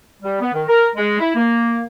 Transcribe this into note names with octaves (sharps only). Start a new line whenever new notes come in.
G3
B3
D#3
A#4
G#3
E4
A#3